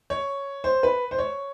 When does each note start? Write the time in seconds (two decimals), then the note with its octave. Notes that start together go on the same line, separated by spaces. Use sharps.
0.10 C#5
0.64 C5
0.83 B4
1.11 C5
1.19 C#5